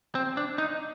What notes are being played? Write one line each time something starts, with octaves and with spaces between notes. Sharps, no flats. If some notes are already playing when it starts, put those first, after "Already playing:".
C4
D4
D#4